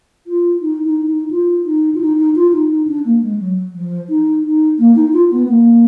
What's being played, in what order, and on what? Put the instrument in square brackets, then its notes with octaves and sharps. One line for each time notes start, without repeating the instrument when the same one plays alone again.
[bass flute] F4
D#4
D#4
D#4
F4
D#4
F4
D#4
D#4
F4
D#4
D#4
D4
A#3
G#3
F#3
F3
D#4
D#4
A#3
D#4
F4
B3
A#3